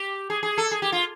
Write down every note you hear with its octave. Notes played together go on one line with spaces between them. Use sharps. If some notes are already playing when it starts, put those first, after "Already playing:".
Already playing: G4
G#4
G#4
A4
G#4
G4
F4